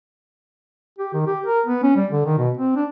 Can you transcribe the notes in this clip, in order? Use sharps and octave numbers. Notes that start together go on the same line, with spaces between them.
G4
D#3
G4
A#4
B3
C#4
G3
D3
D#3
B2
C4
D4